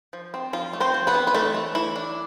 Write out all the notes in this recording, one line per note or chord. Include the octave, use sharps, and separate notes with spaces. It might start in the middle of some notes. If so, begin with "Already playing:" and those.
F3
C4
F3 F4
A3
C4 C5
F3
B3 B4
C4
B4
E3 A3 A4
A3
E3 E4
D4